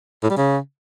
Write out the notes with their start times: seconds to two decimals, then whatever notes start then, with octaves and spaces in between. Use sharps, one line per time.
0.23 A2
0.30 G3
0.37 C#3